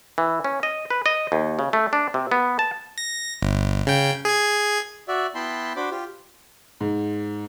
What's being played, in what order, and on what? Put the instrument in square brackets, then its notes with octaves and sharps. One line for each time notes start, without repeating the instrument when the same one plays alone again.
[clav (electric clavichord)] E3
C#4
D#5
B4
D#5
D#2
C#3
A3
D4
C3
B3
A5
[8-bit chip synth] A#6
G1
C#3 G5
G#4 G#6
[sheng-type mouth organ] F#4 D5 E5
B3 E4 G5 A5 B5 C6
D4 F#4 C5 B5 D6
F4 G4
[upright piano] G#2